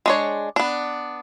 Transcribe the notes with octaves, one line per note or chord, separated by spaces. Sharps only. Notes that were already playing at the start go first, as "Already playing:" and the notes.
G#3 D4 C#5
B3 D4